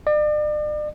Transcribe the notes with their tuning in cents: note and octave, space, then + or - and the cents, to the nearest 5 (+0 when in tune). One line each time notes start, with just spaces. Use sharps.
D5 +40